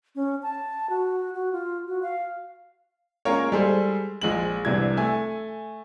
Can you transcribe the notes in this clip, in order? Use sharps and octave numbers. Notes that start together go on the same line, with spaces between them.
C#4
A5
F#4
F#4
F4
F#4
F5
G#3 A#3 C#4 F4 A#4 C#5
G3 G#3 G#4 A4 C5
A#1 G#3 F#7
C2 C3 E3 D4 G#6
A3 G#5